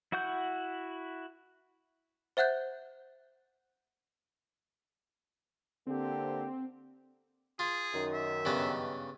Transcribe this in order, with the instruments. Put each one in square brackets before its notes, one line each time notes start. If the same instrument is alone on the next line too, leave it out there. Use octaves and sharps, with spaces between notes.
[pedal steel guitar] E4 F#4 F#5 C#6 G6
[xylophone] C5 E5 F#5 F#6 G6
[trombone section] D3 A#3 G4 [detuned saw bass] C4
[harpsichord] F4 [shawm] G#4
[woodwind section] F#2 D#3
[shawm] E5
[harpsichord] G2 C#3 B3